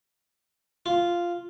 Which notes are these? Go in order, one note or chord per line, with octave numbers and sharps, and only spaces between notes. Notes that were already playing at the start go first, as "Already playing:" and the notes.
F4